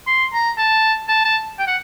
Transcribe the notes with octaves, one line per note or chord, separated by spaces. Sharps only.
C6
A#5
A5
A5
A5
G5
F#5